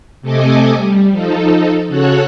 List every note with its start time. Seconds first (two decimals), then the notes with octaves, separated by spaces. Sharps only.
0.22 C3 A3 A4 D#5 G#5 D6
0.75 G3
1.11 F3 D#4 A4
1.88 C#3 F#4 A4 C#5 F#6